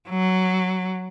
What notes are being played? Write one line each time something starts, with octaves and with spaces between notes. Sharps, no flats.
F#3